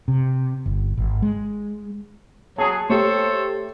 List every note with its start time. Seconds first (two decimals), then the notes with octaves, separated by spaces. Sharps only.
0.08 C3
0.66 G1
0.97 G#1
1.22 G#3
2.58 F#3 G#4 A5
2.90 A3 G4 A4 C5 C#5